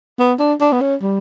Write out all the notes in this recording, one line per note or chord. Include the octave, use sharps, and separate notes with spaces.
B3
D4
D4
B3
C#4
G3